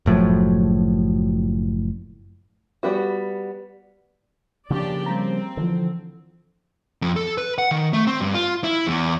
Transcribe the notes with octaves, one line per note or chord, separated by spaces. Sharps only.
F#1 A2 F3 F#3
G3 B3 F#4
C#3 F3 A#3 D4 G4 D5
G3 C4 A#5
D3 E3 F3
F2
A4
B4
F#5
D#3
A3
C4
G2
F4
E4
E2